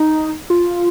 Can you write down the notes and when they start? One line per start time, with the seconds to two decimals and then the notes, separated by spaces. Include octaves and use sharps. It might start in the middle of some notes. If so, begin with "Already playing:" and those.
Already playing: D#4
0.50 F4